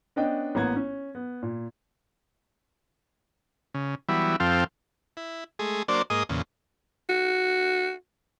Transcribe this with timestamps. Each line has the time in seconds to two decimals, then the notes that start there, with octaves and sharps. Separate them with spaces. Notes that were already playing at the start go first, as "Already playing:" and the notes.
0.16 B3 C#4 D4 D#5 G5
0.55 A1 A#3 B3 G#6
0.76 C#4
1.15 B3
1.43 A#2
3.74 C#3
4.09 E3 F#3 G3 B3 E4
4.40 F2 F3 C4 A4 F5 G5
5.17 E4
5.59 G#3 A3 G#4
5.88 F#3 A#3 D4 C5 D5
6.10 G#2 A#3 G#4 D#5 D#6
6.29 E2 A#2 C#3
7.09 F#4